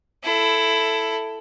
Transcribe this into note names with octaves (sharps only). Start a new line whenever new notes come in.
E4 A4